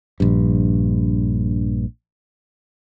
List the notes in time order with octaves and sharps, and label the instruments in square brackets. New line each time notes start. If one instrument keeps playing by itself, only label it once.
[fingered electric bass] A#1 G2